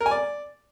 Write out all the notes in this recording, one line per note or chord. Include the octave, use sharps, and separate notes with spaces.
A#4
G#5
D5